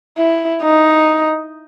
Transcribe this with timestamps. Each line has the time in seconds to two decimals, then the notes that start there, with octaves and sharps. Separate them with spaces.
0.18 E4
0.63 D#4